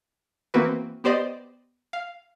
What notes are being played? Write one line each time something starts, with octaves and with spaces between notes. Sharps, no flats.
E3 A#3 C4 F#4 B4
B3 G4 C5 D5 D#5
F5